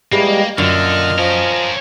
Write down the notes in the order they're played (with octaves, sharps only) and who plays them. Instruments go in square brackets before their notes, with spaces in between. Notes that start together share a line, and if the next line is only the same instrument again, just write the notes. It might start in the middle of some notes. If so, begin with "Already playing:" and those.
[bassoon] E3 [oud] G3 G#3 G4 [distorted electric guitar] A#3
[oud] F#2 [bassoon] A#2 [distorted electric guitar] D3 [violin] D#5 F6
[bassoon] F3 [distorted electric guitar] C#4 A#4